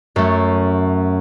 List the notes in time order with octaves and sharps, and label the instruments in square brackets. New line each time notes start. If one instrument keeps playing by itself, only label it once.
[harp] F#2 A3